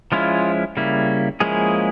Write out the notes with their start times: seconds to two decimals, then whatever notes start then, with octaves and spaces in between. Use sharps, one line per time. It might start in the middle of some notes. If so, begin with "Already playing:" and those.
0.12 F3 G#3 C#4 E4 F4
0.77 C#3 G3 A#3 E4
1.40 F3 G#3 A#3 C#4 E4 G#4